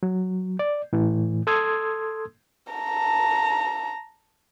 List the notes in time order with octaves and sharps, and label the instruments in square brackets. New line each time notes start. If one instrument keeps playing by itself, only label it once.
[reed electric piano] F#3
D5
A2 E3
A4 C6 D#6 E6 G#6
[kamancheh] A5 A#5